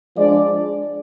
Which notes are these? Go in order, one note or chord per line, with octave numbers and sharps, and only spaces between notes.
F3 G#3 D4 D5